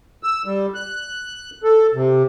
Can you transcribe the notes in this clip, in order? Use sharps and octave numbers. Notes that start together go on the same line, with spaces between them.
E6
G3
F#6
A4
C3